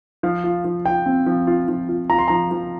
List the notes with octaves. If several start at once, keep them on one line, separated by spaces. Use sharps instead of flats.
F3 F5
F4
F3
F4 G5
C4
F3
F4
F3
F4
F4 A#5
C6
F3 A#5
F3